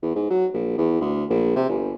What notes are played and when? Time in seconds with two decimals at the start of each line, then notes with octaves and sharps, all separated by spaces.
0.03 E2
0.15 G#2
0.30 F#3
0.53 A#1
0.78 E2
1.01 D2
1.30 A#1
1.56 C3
1.69 G1